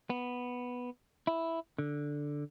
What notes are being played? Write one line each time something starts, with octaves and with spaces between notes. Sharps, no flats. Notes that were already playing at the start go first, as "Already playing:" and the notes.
B3
E4
D3